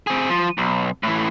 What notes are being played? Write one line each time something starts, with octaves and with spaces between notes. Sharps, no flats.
C4 G#4
F3
B1
A2 E3